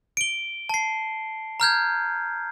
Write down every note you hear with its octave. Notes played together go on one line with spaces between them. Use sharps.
D7 G7
A5 C7
A#5 F6 G6 G#6